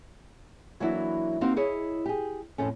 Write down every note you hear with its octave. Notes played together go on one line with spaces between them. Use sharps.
E3 F#3 A#3 D4 E4 F#4
A#3 C4 D#4 F#4 F5
E4 G#4 C#5 D#5
G4 G#4
F2 A2 A3 C#4